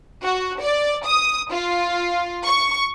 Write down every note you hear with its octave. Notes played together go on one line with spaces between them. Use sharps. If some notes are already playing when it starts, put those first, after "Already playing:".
F#4
D5
D#6
F4
C#6